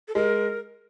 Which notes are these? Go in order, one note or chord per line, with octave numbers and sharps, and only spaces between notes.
A4
G#3 A#4